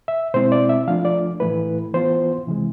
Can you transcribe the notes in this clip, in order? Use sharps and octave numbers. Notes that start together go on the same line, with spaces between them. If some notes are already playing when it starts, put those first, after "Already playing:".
E5
B2 G#3 C4 E4 C5
D5
E5
F3 A3 D4 F4 F5
D5
A2 E3 A3 E4 B4
E3 B3 F4 C5
C3 E3 G#3